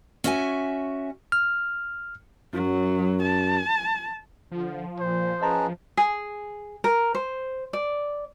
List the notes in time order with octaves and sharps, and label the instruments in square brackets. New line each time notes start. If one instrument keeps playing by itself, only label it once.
[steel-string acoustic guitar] C#4 F#4 E5 G5 G#5
[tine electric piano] F6
[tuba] F#2 [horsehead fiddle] F#3
[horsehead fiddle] A5
[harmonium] D3 [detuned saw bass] F3
[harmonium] A#2 [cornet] C5
[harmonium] C#4 G#4 B4 [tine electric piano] D#5 A5 A#5
[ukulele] G#4
A#4
C5
D5